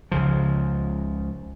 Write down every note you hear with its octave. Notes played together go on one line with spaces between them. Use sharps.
C#2 C#3 F3